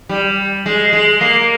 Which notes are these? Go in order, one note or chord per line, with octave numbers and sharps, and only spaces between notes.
G3
G#3
G#3
A#3